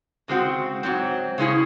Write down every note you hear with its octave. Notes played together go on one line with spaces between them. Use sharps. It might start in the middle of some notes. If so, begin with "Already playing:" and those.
C#3 G#3 C4 F#4 C5
G#2 F#3 C4
C#3 G#3 C#4 E4 G#4